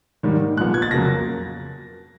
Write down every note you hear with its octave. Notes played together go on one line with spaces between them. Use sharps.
G#2 D#3 G3 A#3
A#2 F3 G#3 B3 F#6
G#6
A6
F2 C#3 F#3 A#3 A#6